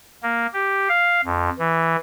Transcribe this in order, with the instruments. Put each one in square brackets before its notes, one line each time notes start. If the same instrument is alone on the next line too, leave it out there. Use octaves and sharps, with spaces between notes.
[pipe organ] A#3
G4
F5
F2
E3